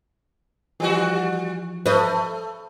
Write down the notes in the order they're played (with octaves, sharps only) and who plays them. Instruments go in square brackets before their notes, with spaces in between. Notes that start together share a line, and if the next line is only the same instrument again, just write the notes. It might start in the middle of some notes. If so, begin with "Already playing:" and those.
[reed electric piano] E3 F3 [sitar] G3 F#4
[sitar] A3 [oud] B4 D#5